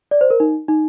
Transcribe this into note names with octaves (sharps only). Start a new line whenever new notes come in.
D5
C5
A#4
D#4
D#4